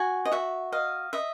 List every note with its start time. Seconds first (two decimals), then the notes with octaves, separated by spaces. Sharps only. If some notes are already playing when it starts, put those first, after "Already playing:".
Already playing: F#4 G#5
0.25 D#5
0.31 F#4 E5
0.72 D#5 F5
1.13 D#5 E5